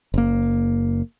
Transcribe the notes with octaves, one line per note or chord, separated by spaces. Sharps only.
F#1 A#3